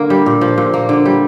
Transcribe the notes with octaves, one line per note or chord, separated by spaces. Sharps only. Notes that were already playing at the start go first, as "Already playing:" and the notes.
Already playing: D3 A#3 A#4
G3
A#2
F3
A#2
A#3
D3
G3